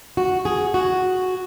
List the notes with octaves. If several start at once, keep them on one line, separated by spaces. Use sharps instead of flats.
F#4
G#4
F#4